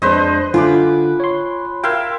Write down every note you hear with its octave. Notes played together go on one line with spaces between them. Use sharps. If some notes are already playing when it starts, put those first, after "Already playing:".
F2 G#3 D4 B4 C5 D#5
D3 F4 G#5 B5 D6
C#5 C6
A#4 E5 F5 G5 C6 G#6